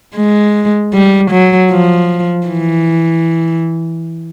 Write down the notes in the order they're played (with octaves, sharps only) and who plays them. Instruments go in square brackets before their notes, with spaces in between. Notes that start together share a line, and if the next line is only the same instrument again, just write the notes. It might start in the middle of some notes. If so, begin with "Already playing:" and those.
[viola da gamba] G#3
G3
F#3
F3
E3